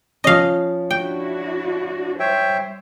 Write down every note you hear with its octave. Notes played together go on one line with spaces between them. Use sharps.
F3 C#4 D#5 F5
D4 E4 F#4 G5
G3 C5 C#5 E5 G5